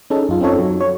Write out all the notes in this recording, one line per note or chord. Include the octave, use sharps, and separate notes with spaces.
C#4 D#4 G#4 A4
F#2 F4
C4 C#4 D#4 F4 A4 C#5
F#3
C#5